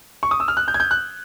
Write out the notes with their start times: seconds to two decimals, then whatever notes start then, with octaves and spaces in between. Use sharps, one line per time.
0.23 C#6
0.31 D#6
0.40 E6
0.48 F6
0.57 F#6
0.68 G6
0.74 G#6
0.80 G6
0.91 F#6